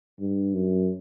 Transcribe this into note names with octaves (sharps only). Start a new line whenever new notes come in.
G2
F#2